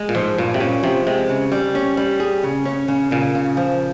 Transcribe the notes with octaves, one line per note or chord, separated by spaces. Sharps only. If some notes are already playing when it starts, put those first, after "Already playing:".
Already playing: G#3
A#2
G#2 F3
G2 A#2
C3
A#2 C#4
C3 F3
C3 G#3
C#3
G3
C#4
G3
G#4
C#3
C#4
C#3
A#2 C#3
C#3
F3